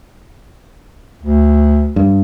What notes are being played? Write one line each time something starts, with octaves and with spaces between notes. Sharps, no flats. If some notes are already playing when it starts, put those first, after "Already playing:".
D2
G2